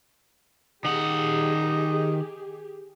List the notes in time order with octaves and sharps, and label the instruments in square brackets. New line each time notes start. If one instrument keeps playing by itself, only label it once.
[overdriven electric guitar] D#3 F#5 [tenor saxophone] D#4 [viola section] G4 G#4